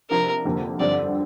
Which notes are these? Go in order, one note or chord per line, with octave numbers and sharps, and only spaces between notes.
C3 F3 D4 A#4
F2 D3 A#3 G4
G2 D3 F3 C4 G4 D5